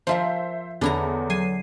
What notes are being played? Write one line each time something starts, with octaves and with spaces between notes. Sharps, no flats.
F3 F4 A#4 C5 E5
E2 D3 E4 A4 C#5 F#5 A#5
F#3 G#5 C7 D#7